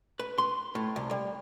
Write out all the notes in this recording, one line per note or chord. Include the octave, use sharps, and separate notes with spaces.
B4
C6
A2
C2
G3